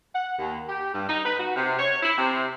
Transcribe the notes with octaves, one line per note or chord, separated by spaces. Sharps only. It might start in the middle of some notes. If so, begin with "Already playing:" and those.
F#5
D#2
G4
G2
D#4
B4
F#4
C3
C#5
E4
C3